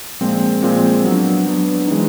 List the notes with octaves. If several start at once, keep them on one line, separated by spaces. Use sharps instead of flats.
A#2 F3 G#3 C4
A#2 F3 G#3 C4
F#3 B3 D4
F#3 B3 D4
E3 G#3 C4 D#4